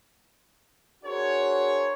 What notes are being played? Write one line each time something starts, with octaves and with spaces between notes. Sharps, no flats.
D4 F#4 G#4 A#4 C5 C#5